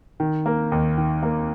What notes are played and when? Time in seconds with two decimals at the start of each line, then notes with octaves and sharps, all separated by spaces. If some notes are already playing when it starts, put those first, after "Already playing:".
0.20 D#3
0.46 A#3
0.72 D#2
0.98 D#3
1.23 A#3